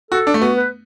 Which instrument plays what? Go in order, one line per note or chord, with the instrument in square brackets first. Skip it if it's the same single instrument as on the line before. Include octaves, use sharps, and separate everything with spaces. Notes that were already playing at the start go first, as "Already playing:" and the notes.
[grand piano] F#4 [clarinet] A4
[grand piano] D4
A3
[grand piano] B3 [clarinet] F#4
[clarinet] B4